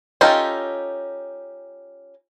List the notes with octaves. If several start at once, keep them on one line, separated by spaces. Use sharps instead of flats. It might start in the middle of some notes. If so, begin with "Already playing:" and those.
C#4 D#4 F4 G4 A4